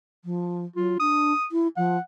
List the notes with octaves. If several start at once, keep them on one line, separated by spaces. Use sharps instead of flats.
F3
F#3 F4
D4 D#6
E4
F3 F#5